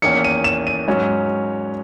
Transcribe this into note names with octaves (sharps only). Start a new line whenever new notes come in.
E2 D#3 A#3 C#4 C#7
D#7
E7
D#7
G#2 F#3 C#4